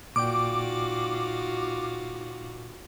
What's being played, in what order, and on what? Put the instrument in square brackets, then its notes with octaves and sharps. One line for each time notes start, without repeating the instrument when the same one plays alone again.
[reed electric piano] A#2 D5 G5 [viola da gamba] D#4 F4 F#4 [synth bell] D6